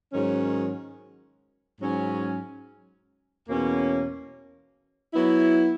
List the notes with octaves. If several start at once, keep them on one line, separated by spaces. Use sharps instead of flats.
G#2 D#3 F#3 C#4
G#2 F#3 C#4
E2 B2 A#3 C#4
F#3 B3 E4